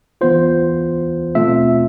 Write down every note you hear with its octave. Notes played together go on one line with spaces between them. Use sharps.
E3 B3 F4 C5
B2 A3 C4 F4 E5